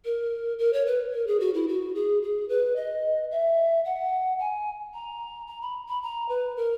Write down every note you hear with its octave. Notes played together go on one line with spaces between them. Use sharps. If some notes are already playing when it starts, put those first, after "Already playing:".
A#4
A#4
C#5
B4
A#4
G#4
F#4
E4
F#4
G#4
G#4
B4
D#5
E5
F#5
G#5
A#5
A#5
B5
B5
A#5
B4
A#4